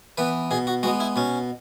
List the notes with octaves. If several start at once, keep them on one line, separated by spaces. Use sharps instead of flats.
E3 B3 B4
B2 G#4
F#4
G#3 B3 F#4
E4
B2 C#4